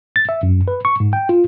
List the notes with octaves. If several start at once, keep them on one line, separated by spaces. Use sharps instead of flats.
A6
E5
F#2
B4
C#6
G#2
G5
F4